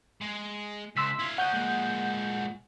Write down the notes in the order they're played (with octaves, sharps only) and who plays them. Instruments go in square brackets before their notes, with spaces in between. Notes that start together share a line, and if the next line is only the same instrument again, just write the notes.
[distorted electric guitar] G#3
[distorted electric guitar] C#2 [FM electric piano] C6 E6 B6
[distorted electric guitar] E4 F5
[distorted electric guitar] C#4 D#5 [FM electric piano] F#5 G6
[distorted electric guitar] A#2 G#3